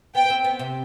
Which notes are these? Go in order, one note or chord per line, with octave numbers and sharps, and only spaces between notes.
B3 G5
B3
C4
B3
C3